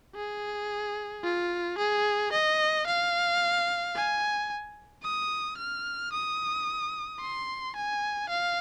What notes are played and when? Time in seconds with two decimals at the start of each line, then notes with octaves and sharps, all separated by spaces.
0.15 G#4
1.23 F4
1.78 G#4
2.32 D#5
2.87 F5
3.95 G#5
5.03 D#6
5.58 F6
6.13 D#6
7.20 C6
7.75 G#5
8.29 F5